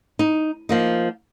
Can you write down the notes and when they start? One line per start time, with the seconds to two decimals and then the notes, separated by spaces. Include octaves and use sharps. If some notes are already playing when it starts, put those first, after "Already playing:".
0.19 D#4
0.69 F3 A#3 D#4